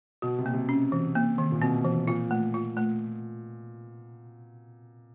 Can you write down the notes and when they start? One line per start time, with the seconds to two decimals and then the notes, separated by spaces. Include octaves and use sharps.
0.22 B2 F#4
0.38 C3
0.46 A#3
0.53 C3
0.69 C#4
0.92 E3
1.15 A#3
1.38 D#3
1.52 A#2
1.61 B2 C4
1.85 E3
2.07 A#2 F4
2.31 A3
2.54 F4
2.77 A3